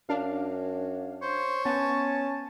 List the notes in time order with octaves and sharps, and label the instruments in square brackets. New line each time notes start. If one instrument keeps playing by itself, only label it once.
[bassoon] F#2 [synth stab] D4 F5
[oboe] C5 [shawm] C#5
[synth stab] B3 [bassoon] C#4 [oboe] A5